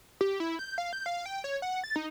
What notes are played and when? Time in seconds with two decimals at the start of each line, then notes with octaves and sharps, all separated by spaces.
0.21 G4
0.40 E4
0.59 G6
0.78 F5
0.93 G6
1.06 F5
1.26 G5
1.44 C#5
1.62 F#5
1.84 A6
1.96 D#4